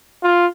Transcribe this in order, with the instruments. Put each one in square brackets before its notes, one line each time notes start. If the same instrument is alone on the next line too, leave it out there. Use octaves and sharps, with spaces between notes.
[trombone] F4